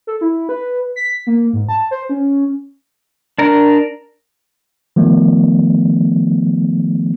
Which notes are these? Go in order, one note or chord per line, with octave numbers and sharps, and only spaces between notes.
A4
E4
B4
B6
A#3
G#2
A5
C5
C#4
D4 A#4
D#3 F3 A3 B3